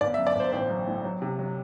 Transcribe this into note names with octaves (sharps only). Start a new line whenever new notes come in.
G1 D5
E5
F#2
D5
G1 C5
A1 C5
F#3
A2
F#3
C3
F#3